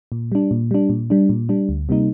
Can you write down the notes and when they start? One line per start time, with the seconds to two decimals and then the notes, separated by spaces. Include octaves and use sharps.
0.12 A#2
0.32 G3 D4
0.51 A#2
0.71 G3 D4
0.90 A#2
1.10 G3 D4
1.29 A#2
1.49 G3 D4
1.69 D2
1.89 C3 G3 A#3 D#4